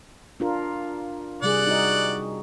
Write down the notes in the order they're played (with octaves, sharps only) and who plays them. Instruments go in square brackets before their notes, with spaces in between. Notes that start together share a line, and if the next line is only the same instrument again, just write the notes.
[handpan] D4 F4 A#4
[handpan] C3 G3 G#4 [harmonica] D5 F#5
[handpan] D#4 F#4 D#5